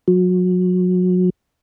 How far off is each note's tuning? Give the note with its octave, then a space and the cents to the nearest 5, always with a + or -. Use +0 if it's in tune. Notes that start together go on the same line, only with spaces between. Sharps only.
F#3 -30